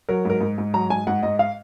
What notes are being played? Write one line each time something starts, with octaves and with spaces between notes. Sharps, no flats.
F#3 A#4
G#2 A#4
G#2
G#2
F#3 A#5
G#2 G#5
G#2 F#5
G#2 D#5
F5